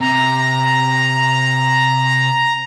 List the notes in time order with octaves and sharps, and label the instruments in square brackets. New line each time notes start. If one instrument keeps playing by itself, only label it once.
[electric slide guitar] C3 [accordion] A#5